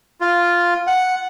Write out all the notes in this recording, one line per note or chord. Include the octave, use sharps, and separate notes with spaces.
F4
F#5